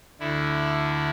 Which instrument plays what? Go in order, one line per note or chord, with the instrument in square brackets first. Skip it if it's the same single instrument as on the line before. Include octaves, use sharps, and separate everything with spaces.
[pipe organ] D2 D3 E4